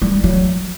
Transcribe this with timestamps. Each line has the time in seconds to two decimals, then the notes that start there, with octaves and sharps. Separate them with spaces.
0.02 G3
0.24 F#3